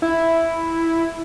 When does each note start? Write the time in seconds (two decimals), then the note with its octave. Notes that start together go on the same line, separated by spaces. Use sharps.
0.02 E4